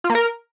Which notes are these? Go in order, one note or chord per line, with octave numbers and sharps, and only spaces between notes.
F4
A#3
A#4